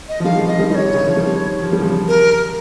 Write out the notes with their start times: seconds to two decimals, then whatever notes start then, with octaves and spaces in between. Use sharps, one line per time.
0.09 D#5
0.20 F3
0.24 D#3 G3 F5
0.36 F3 G#3
0.47 F3 G#3 D#5
0.59 D#3 G3
0.70 D#3 G3 C#5 D#5
0.85 C3
0.94 C#3
1.01 D#3
1.08 F3
1.16 D#3 G3
1.62 F3
1.72 G3
1.81 C#3 F3
2.08 A#4